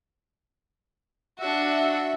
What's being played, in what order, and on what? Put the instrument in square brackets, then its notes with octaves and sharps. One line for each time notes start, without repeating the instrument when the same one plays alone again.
[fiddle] D4 F#4 [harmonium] E5